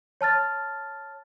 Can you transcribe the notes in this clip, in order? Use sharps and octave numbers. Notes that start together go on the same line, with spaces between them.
C#5 A5 F6 A6